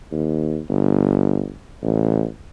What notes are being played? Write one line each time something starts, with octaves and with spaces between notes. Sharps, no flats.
D#2
G1
A1